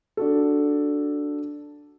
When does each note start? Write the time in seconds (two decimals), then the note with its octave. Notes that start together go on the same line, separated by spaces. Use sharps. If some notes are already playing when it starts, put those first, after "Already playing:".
0.17 D4 F#4 A4